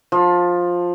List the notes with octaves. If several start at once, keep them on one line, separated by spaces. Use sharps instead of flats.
F3